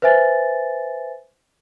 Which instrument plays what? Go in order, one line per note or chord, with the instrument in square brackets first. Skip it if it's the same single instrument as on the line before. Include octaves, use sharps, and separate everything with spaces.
[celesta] B4 C5 E5 G#5 A6